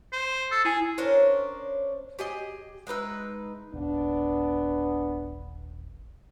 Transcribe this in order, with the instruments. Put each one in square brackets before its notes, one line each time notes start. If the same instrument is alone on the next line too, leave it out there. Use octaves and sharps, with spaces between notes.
[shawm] C5
[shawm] A4 [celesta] E6
[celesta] E4 G#5 [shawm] G#4
[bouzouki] C#4 D4 A#4 C5
G4 G#4 D#5
G#3 D#4 B4 E5
[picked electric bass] D#1 [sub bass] G#1 [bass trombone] B3 [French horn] D4